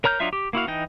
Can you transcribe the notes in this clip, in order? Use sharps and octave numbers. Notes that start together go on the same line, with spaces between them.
A#4 C#5 A#5 F6 G6
F#3 D4 D#4 F4 E5
G4
A#3 E4 F#4 F5
E3 D#4 D#5 G5